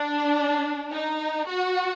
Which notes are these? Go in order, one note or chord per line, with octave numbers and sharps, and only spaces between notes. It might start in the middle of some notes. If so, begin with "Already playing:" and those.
Already playing: D4
D#4
F#4